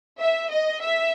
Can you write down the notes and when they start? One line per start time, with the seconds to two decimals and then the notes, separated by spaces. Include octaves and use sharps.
0.20 E5
0.51 D#5
0.81 E5